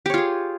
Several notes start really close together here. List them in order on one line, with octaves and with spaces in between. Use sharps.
G4 C#5 F4 G#4